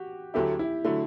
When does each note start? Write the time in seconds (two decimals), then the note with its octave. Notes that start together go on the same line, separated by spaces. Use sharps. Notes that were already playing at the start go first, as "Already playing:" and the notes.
Already playing: F#4 G4
0.34 D2 D3 F#3 A3 E4 G4
0.59 E4
0.84 D3 F#3 A3 E4